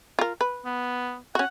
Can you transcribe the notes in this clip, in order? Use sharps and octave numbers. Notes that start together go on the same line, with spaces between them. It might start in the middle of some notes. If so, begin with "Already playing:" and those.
F4 A#4
B4
B3
C#4 F#4 F#5